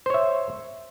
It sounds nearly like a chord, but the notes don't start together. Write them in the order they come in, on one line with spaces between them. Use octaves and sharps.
C5 C#5 E5